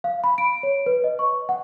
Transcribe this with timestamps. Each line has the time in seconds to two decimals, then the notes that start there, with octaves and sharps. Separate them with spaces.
0.04 F5
0.24 B5
0.38 D7
0.63 C#5
0.86 B4
1.04 D#5
1.19 C#6
1.49 F#5